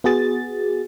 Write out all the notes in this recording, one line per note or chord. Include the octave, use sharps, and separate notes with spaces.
B3 F#4 G#4 A6